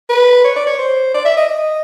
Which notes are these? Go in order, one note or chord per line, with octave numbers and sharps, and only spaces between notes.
B4
C#5
D5
C#5
C5
D5
E5
D#5
D#5